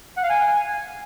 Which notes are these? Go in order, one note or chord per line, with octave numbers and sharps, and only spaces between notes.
F#5
F5
G#5